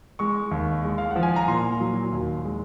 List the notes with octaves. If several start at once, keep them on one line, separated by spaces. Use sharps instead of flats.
G#3 C#6
D#2
G#3
F5
F3 F#5
G#5
A#5
A#2 C6
F#3
D#2
G#3